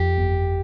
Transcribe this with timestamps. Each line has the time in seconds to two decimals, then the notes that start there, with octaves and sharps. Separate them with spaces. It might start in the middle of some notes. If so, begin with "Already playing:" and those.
Already playing: F2 G4
0.18 G1